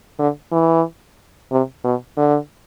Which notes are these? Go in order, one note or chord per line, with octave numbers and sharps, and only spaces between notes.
D3
E3
C3
B2
D3